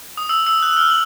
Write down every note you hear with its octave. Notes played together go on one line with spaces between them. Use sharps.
D#6
E6
E6
F#6
F6
F#7